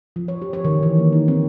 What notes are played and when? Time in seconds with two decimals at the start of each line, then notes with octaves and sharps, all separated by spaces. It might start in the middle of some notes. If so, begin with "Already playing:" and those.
0.16 F3
0.28 C#5
0.42 G4
0.53 C#5
0.65 D#3
0.83 E3
0.98 A#3
1.13 D#4
1.28 C4